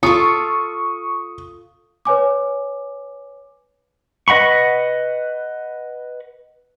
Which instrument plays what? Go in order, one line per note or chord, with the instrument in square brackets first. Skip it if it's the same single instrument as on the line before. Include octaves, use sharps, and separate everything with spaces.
[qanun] F4 A4 [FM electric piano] C#6 [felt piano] D#6
[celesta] B4 C#5 G#5 D6
[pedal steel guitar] B4 D#5 F#5 B5 C#6